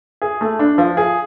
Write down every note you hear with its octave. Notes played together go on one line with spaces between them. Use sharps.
G#4
A3
D4
F3
G#4